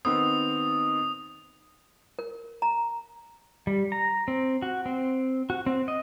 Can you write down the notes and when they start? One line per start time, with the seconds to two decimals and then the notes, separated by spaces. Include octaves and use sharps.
0.05 D#3 B3 C4 D#6
2.19 A#4
2.62 A#5
3.67 G3
3.92 A#5
4.28 C4
4.62 F#4
4.86 C4
5.50 F#4
5.66 C4
5.88 D#5